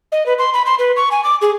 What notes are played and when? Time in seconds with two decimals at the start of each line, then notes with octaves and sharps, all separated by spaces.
0.12 D#5
0.26 B4
0.39 C6
0.54 B5
0.66 C6
0.79 B4
0.96 C#6
1.11 G#5
1.24 D6
1.42 G#4